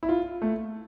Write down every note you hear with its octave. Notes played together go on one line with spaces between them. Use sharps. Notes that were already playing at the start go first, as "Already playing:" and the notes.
E4
F4
A3